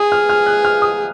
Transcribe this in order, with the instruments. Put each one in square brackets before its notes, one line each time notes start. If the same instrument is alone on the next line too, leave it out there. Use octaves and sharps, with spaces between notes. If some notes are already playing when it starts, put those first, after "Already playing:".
Already playing: [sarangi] G#4 [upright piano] D#6
[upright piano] F6
F6
F#6
F6
D#6